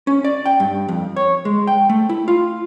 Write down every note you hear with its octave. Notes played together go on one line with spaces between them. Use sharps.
C#4
D5
G5
G2
F2
C#5
G#3
G5
A3
E4
F4